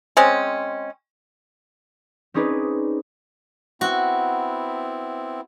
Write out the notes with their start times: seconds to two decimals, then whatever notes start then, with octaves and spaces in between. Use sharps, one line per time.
0.17 G#3 C4 C#4
2.34 C4 C#4 D#4 G#4 B4 D5
3.81 B3 C4 E4 F#4